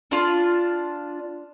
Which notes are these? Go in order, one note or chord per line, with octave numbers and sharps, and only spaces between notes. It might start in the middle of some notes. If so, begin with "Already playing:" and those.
D4 F4